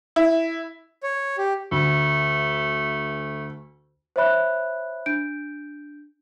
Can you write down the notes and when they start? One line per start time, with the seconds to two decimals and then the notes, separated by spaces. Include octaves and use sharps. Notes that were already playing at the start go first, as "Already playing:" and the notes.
0.16 E4
1.03 C#5
1.38 G4
1.72 D2 A3
4.16 C5 C#5 E5 B5 F#6
5.06 D4 G6 D7